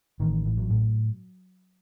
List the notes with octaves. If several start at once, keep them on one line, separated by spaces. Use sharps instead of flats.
A1 D#3
A1
F#3
A2